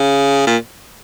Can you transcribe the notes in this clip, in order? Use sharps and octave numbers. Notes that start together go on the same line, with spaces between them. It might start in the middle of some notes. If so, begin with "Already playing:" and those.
Already playing: C#3
A#2